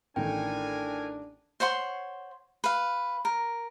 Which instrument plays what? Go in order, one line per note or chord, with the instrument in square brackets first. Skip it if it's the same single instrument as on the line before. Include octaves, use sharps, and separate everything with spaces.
[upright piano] A1 D#3 A3 [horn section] A2 A#4 G#5 [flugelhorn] D4 [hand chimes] G5
[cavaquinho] C5 C#5 F#5 C6
B4 F5
A#4